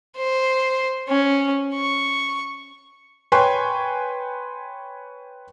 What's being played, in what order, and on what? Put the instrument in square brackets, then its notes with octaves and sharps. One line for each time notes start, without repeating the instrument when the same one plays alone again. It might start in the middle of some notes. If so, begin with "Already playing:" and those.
[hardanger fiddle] C5
C#4
C#6
[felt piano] B4 C#5 G5 G#5 C6 C#6